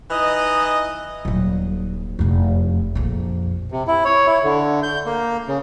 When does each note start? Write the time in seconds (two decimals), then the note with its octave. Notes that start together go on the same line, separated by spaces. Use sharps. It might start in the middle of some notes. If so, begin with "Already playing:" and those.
0.11 E3 D#4 D#5
1.25 D#1 F#3
2.19 F1 E2
2.95 A#1 F2
3.72 C3
3.87 E4
4.05 C#5
4.27 E4
4.44 D3
4.83 G6
5.06 A#3
5.48 C#3